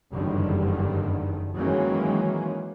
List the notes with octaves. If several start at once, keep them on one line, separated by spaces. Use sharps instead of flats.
F#1 E2 G2 D3 D#3 G3
D#3 E3 F#3 G#3 A#3 C#4